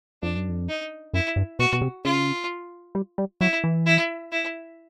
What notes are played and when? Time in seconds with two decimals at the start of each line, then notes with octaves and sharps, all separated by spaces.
0.23 F2 D4
0.36 F#2
0.49 F2
0.69 D#4
1.14 F#2 E4
1.36 G2
1.59 B2 F#4
1.72 B2
1.81 C3
2.04 C#3 F4
2.95 G3
3.18 G3
3.41 F#3 E4
3.64 E3
3.86 E4
4.32 E4